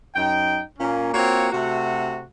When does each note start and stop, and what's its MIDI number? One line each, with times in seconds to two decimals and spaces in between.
0.15 0.61 42
0.15 0.61 63
0.15 0.61 79
0.79 1.12 46
0.79 1.12 58
0.79 1.12 61
1.14 1.48 58
1.14 1.48 60
1.14 1.48 65
1.14 1.48 66
1.14 1.48 73
1.52 2.24 48
1.52 2.24 57
1.52 2.24 66